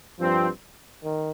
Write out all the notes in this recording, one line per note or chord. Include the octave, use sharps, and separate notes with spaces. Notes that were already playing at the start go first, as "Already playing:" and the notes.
G2 F3 C4
D#3